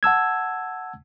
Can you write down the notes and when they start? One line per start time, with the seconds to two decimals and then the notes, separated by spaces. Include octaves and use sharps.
0.03 F#5 A5 E6 G#6